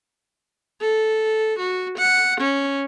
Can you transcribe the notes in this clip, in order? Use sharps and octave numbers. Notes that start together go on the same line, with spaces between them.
A4
F#4
F#5
C#4